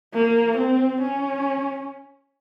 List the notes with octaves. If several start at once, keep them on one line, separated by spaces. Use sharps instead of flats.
A#3
C4
C#4